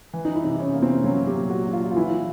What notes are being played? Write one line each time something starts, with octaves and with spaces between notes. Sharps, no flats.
E3
D#4
E4
C3
C#4
A#3
C4
F#3 C#4
G4
A#2
F#4
D4
F4
F4
E3 E4